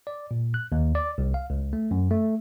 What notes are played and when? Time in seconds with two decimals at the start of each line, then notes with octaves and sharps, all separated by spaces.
0.07 D5
0.31 A#2
0.54 F#6
0.72 D#2
0.95 D5
1.18 C2
1.34 F5
1.50 C#2
1.73 A3
1.91 F#2
2.11 A3